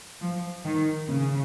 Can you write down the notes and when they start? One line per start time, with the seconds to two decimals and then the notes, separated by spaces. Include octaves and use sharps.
0.21 F3
0.65 D#3
1.09 C#3